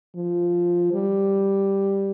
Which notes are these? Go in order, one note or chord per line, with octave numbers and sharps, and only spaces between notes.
F3
G3